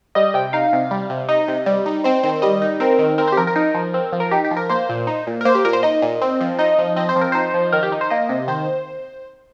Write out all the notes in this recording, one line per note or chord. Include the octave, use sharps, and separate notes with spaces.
G3 D#5
C3 G5
D#4 F5
C3
G3
C3
D#4 D#5
C3
G3
D#4
C4 C5
D#3 C5
G3 D#5
D#4
C4 A#4
D#3
C4 A#4
G4 C5
F3 A#4
A#4
D#4
F3
C4
F3
A#4
D#4 G4
G4
F3
A#4
A#3 C5
A#2
D#4
A#2
A#4
A#3 C5
G4
A#2 A#4
C5
D#4 D#5
A#2
C4
F3
D#4 D#5
F3
C4 D#5
C5
F3
A#4
D#4 C5
F3
D#3 A#4
G4
D#4
C5
A#3 D#5
C3
D#3 C5